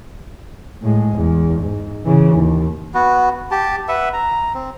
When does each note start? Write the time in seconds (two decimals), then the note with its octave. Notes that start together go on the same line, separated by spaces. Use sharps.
0.82 A2 G#3
1.15 E2
1.61 G#2
2.04 C#3 E3
2.36 D#2
2.94 B3 F#4
3.51 G4 A5
3.88 B4 E5 F#5
4.13 A#5
4.54 C4